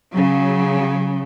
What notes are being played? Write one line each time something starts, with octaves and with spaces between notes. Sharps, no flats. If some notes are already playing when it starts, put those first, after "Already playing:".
C#3 F#3